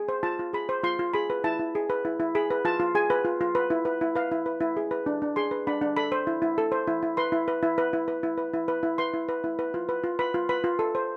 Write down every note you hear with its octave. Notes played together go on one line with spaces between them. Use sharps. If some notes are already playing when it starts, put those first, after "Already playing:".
Already playing: G#4
C5
F4 A5
F4
G#4 B5
C5
F4 C6
F4
G#4 B5
B4
E4 A5
E4
G#4
B4
E4
E4
G#4 B5
B4
F4 A5
F4
G#4 G#5
B4
F4
F4
B4
E4
B4
E4
B4 F5
E4
B4
E4
G#4
B4
D4
D4
G#4 C6
B4
D4 B5
D4
A4 B5
C5
E4
E4
A4
C5
E4
E4
B4 C6
E4
B4
E4
B4
E4
B4
E4
B4
E4
B4
E4
B4 C6
E4
B4
E4
B4
F4
B4
F4
B4 B5
F4
B4 B5
F4
A4
C5